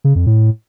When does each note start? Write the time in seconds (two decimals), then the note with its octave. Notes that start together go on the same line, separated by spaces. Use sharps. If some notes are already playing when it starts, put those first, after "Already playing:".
0.04 C#3
0.15 F2
0.27 A2